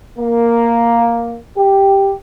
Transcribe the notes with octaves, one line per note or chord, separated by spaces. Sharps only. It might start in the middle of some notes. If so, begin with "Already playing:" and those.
A#3
G4